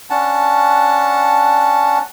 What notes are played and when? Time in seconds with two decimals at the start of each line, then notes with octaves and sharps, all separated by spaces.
0.10 C#4 D4 F#5 A5